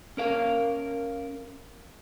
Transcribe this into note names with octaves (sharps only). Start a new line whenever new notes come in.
C#4 A#4 F5